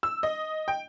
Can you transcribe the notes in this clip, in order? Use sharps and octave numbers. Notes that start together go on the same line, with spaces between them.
E6
D#5
G5